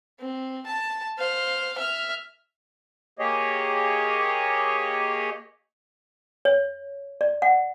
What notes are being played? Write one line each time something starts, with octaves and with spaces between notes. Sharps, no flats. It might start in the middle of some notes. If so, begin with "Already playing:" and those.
C4
A5
C5 F5
E5 F6
A#3 G4 G#4 C#5 D#5
C#5
D5
F#5